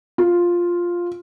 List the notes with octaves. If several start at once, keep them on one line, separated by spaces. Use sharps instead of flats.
F4